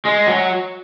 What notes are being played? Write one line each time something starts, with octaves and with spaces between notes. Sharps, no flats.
G#3
F#3